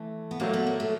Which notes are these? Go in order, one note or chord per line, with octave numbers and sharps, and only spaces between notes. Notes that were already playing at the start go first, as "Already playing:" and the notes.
Already playing: E3 A3
B3
A#2 F#3 A3 A#3
B3
A#3
A3